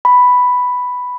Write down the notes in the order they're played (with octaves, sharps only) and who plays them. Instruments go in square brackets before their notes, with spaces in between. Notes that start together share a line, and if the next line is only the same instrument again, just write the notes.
[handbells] B5